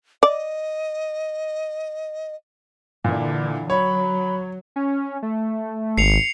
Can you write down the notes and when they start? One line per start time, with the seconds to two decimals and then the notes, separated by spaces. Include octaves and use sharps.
0.23 D5 D#5
3.04 A#2 D3 E3
3.70 F#3 C#5 B5
4.76 C#4
5.23 A3
5.98 G#1 C7 C#7 F7